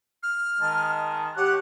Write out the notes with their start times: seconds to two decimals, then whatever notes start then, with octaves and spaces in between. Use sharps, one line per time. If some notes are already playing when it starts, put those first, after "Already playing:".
0.23 F6
0.61 D#3 G#3 A5
1.37 G4 C#5 F#5 D6 F#6